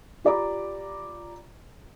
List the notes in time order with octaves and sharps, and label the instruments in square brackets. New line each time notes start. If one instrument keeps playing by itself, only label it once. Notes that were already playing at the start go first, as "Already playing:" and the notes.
[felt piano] F4 G4 D5 A#5 B5 D6